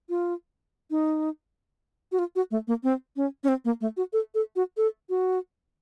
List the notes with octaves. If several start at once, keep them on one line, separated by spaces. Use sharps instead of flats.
F4
D#4
F#4
F4
F#4
A3
A#3
C4
C#4
C#4
C4
A#3
A3
F#4
A4
A4
F#4
A4
F#4